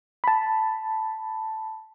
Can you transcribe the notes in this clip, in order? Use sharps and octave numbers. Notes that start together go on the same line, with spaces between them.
A5 B5